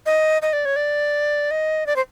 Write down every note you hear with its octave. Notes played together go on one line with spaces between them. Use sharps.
D#5
D#5
D5
C#5
D5
D#5
D5
C5